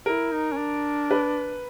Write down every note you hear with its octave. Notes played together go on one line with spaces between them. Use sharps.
E4 A#4
D#4
C#4
D4
B4